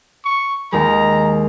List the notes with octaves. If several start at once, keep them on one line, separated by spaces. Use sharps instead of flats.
C#6
D#2 G#3 A#5